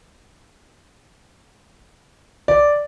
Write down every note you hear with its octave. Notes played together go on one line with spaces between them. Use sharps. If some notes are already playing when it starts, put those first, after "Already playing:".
D5